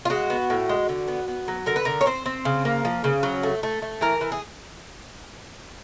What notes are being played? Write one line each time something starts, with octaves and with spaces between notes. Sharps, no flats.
F4
G#3 F#4
B3
A2
G#3
D3
B3
B3
F#3
D3 A#4
B4
D3 A#4
C#5
C4 C5
C4
C#3
A#3
F3
C#3
F#3
A3
A3
A3
E3 A#4
E3
G#4